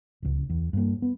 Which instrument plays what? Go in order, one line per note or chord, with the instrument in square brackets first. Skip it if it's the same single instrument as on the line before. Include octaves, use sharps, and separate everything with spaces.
[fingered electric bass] D1 C#2
E2
G2 A#3
B3